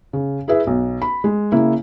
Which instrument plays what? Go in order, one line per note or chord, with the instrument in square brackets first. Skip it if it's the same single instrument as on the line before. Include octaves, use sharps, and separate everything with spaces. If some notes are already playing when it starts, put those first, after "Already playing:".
[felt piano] C#3
E4 G#4 B4 E5
B1
B5
G#3
C#3 A#3 E4